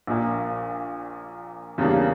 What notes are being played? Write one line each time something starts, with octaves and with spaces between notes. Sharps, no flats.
A#1 A#2 A#3
E2 C#3 G3 A#3 D4